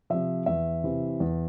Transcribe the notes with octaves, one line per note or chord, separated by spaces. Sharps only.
C3 F3 E5
E2 E5
C3 E3
E2